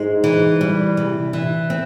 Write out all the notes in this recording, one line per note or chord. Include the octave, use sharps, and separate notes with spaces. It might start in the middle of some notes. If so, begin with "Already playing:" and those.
Already playing: G#2 G#3
E3
G3
C3
E3
C4